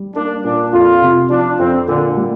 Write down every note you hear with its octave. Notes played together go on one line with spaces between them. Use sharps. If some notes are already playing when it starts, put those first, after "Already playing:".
Already playing: G3
A#3 D4
A#2 D4
F2 F4
C3
F3 D4
F2 C4
A#2 D3
G3